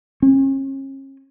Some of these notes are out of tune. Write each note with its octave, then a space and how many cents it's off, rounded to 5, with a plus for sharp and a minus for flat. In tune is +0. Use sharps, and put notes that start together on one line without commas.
C#4 -40